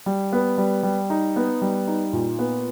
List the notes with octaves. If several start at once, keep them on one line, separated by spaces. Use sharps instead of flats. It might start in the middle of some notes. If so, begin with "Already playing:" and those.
G3
B3
G3
G3
D#4
B3
G3
D#4
A#2
B3